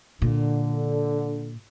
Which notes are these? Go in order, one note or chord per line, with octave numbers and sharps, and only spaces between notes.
A#2 D3